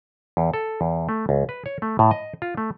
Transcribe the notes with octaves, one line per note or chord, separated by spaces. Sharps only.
E2
A4
E2
A3
C#2
B4
C#5
A3
A2
D#5
F4
A3